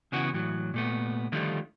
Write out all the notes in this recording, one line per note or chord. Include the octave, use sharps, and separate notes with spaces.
C#3 E3 B3 F#4
A2 E3 F#3
A#2 A3 B3
D3 D#3 F3 G3 A3 F4